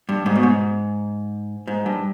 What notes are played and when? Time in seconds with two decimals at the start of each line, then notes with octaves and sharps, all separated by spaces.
0.09 G2
0.26 G#2
0.36 B2
0.43 G#2
1.67 G#2
1.86 G2